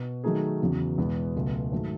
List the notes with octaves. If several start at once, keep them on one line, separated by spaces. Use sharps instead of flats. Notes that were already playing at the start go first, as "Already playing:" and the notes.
Already playing: B2
D#3 F#3 A3 D#4 G#4
E2 C#3 F#3 B3
E2 B2 G#3 B3
C#2 B2 F#3 A3
G#2 D#3 F#3 A3